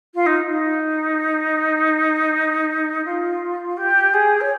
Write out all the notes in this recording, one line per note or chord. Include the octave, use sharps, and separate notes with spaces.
F4
D#4
D#4
F4
G4
G#4
C#5